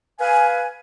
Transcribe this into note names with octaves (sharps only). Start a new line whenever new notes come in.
B4 F5 G#5